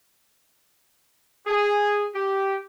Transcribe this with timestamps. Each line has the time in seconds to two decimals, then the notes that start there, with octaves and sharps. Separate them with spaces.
1.47 G#4
2.15 G4